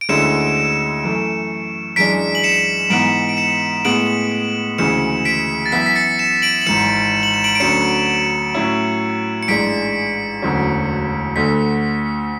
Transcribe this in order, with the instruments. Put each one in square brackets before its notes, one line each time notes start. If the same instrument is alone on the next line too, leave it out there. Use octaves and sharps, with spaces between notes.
[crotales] D7
[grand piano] D2 D3 G#3 C#4 E4 [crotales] C#7 E7
[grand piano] F#2 E3 A3
[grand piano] F#2 E3 G#3 D4 [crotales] B6 D7
[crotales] F#7
C#7 E7
[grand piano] G#2 E3 B3 [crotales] D7 F#7
[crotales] D7
C#7 E7
[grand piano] A2 G#3 B3 [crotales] D7 F#7
[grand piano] D2 C#3 E3 G#3 [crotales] C#7 E7
[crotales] B6 D7
A6
[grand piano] F#2 E3 B3 E4 [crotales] B6
[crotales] B6
A6 C#7
C#7 E7
D7 F#7
F#7
[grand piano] G#1 G#2 E3 [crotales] C#7 E7
[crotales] F#7
E7
D7 F#7
D7
[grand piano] D2 D3 F#3 C#4 [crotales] C#7 E7
[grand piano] A2 F#3 C#4 E4
[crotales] C#7
[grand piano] A1 G#2 G#3 D4 [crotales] B6 D7
[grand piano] E1 D2 D3 F#3 C#4
[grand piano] D2 D3 A3 [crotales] B6